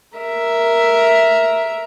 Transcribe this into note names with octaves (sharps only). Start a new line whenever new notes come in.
A#4 E5